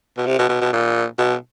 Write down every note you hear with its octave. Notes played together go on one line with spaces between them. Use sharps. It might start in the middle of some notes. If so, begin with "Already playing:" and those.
B2
C3
B2
B2
B2
A#2
B2